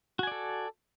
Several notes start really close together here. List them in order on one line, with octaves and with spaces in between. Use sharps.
F#4 G#5 D5 A4